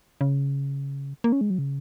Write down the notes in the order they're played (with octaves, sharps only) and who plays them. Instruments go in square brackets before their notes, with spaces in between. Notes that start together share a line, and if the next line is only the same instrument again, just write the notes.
[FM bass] C#3
A#3
C#4
G#3
F#3
C#3